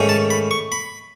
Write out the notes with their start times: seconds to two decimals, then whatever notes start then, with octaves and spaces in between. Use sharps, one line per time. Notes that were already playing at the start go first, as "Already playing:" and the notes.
Already playing: G#2 D#3 A3 C#4
0.09 A5
0.30 B5
0.51 C#6
0.72 B5